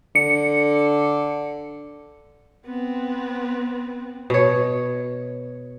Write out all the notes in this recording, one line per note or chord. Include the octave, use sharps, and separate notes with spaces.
D3 C#7
B3 C4
B2 C#5